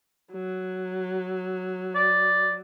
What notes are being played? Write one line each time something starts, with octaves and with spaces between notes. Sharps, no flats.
F#3
D5